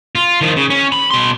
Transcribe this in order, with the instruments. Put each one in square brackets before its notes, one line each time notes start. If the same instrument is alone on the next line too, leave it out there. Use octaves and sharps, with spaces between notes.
[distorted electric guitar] F4
D#3 F3
C#3
C#4
B5
B2 C6